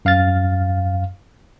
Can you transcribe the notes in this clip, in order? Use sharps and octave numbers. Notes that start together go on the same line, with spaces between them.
F#2 F5 F6 A6